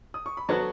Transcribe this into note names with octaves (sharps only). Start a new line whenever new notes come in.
D#6
C#6
B5
F#3 B3 F#4 A4 A5